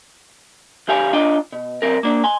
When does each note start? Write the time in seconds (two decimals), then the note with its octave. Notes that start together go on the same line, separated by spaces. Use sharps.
0.88 C#3 E3 G4 F5 G#5
1.13 D4 F4 D#5 G5
1.52 B2
1.82 B1 C4 A#4
2.03 A#3 D4
2.24 G#5 C6